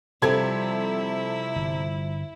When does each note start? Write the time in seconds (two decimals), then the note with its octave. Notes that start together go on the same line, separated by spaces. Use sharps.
0.22 C3 F3 G3 C4 E4 A4 G#6
1.56 G1